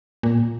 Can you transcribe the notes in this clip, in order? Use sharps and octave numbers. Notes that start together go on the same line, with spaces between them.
A#2